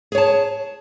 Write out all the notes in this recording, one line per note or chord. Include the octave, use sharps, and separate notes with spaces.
G#4 C#5 A5